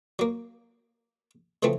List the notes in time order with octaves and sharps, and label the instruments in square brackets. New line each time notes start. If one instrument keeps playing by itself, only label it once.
[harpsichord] F#3 A#3
C#3 E3 F3 A3 C4